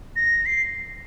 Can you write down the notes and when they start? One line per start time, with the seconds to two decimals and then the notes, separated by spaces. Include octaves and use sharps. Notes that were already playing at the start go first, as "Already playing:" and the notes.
0.16 A#6
0.46 C7